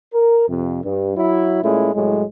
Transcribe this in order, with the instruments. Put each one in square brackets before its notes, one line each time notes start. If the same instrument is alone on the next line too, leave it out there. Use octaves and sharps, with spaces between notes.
[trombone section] A#4
F2 C3
G2
F#3 E4
A#2 G#3 A3 C#4 E4
C2 A2 F#3 G#3